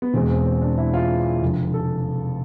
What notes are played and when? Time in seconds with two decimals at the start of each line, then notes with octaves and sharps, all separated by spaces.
0.02 B3
0.14 E1 E2 B2 G#3 C4
0.30 C4
0.46 C4
0.62 D4
0.78 E4
0.94 F4
1.42 F1 F2 D3
1.74 A4